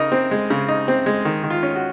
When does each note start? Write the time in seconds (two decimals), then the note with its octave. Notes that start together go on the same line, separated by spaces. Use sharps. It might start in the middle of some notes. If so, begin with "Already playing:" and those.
Already playing: C#3 D#4 A#4
0.12 C4
0.31 G#3
0.50 C#3
0.68 D#4
0.88 C4
1.06 G#3
1.25 D#3
1.43 D#3
1.50 F4
1.63 C#4
1.75 F#4